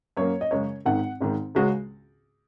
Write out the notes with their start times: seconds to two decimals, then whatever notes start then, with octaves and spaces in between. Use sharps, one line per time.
0.17 F#2 F#3 A#3 C#5
0.41 D#5
0.51 F#2 C#3 G#3 C#5
0.85 G#1 G#2 D#3 F#5
1.20 G#1 G#2 D#3
1.55 C#2 C#3 G#3 F#4